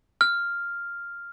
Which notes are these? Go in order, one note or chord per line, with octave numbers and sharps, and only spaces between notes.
F6